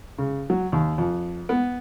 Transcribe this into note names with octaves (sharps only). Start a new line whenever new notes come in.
C#3
F#3
D#2
F2
B3